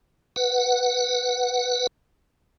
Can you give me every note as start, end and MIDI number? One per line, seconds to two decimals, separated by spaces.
0.36 1.87 71
0.36 1.87 78